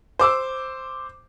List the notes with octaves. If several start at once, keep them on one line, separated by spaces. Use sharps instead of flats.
C5 D6 E6